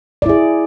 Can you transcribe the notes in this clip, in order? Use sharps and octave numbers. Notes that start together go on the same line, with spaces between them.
E4 G#4 D5